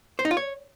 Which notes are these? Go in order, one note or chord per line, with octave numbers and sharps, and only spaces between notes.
C5
D#4
F4
C#5